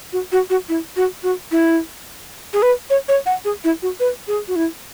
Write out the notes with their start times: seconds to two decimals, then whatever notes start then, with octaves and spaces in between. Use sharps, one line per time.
0.13 F#4
0.32 F#4
0.50 F#4
0.69 E4
0.96 F#4
1.23 F#4
1.51 E4
2.53 G#4
2.62 B4
2.90 C#5
3.08 C#5
3.26 F#5
3.45 G#4
3.64 E4
3.82 F#4
4.00 B4
4.28 G#4
4.48 F#4
4.56 E4